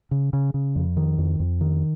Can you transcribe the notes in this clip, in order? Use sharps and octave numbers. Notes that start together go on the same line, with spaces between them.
C#3
C#3
C#3
F2
D#3
F2
F2
D#3